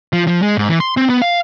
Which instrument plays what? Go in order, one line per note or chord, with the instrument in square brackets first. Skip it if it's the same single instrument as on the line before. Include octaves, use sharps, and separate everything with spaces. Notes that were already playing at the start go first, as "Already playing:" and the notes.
[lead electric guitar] F3
F3
G#3
G#2
E3
C6
C4
B3
F5